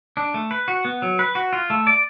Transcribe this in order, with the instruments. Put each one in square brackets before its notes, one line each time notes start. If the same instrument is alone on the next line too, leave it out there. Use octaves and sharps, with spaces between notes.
[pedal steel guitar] D4
A3
B4
F#4
B3
F#3
B4
F#4
F4
A3
D5